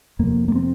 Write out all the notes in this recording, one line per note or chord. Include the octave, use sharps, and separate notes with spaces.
F2 C3 A#3
A#3
C4